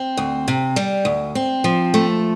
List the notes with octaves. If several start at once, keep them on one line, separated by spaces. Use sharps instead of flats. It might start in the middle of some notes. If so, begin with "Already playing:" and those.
Already playing: C4
D2
C3
G3
D2
C4
F3
A3